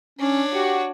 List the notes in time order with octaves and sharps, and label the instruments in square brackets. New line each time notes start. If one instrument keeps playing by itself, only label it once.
[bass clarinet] C#4 [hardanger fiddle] D4 C#5
[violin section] F#4 [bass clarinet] G4